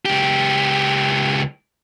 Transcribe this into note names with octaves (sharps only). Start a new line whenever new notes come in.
C#2 G4